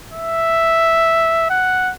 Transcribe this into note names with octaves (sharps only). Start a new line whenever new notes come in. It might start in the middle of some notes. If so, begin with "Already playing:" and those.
E5
F#5